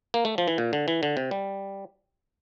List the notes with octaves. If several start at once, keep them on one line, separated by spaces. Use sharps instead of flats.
A#3
A3
F3
E3
A#2
D3
E3
D3
C3
G3